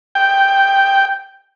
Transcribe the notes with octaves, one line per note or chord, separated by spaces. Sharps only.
G5